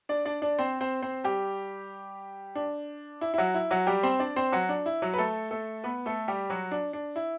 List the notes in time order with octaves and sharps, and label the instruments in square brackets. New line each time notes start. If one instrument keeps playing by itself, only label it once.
[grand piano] D4 D5
D4 D5
D4 D5
C4 C5
C4 C5
C4 C5
G3 G4
D4
E4
E4
F#3 F#4
E4
F#3 F#4
G3 G4
C4 C5
D4 D5
C4 C5
F#3 F#4
D4
E4
F#3 F#4
B4
A3 A4
A3 A4
B3 B4
A3 A4
G3 G4
F#3 F#4
D4
D4
E4